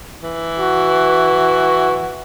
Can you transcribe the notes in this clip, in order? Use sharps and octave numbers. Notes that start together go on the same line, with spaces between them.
E3
F#4